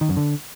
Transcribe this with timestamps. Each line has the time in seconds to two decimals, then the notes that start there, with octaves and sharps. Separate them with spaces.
0.01 D#3
0.09 F#2
0.17 D3